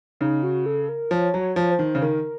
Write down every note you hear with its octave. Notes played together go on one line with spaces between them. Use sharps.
C#3 D#4
F#4
A4
A#4
F3 C#5
F#3
C#5
F3
C5
D#3
C#3
D#3 A#4